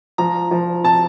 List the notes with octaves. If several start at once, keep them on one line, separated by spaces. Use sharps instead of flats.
F3 A#5
F3
C4 A5